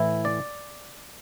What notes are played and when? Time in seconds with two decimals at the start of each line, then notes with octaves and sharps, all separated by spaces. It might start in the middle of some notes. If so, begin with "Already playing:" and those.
Already playing: A2 E3 E4
0.25 D5